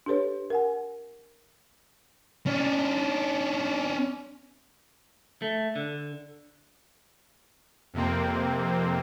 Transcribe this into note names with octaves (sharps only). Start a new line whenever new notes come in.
D4 G4 A4 B4 C#5
A#4 F#5 G#5
C#4 D4
A3
D3
F2 C3 A#3 C4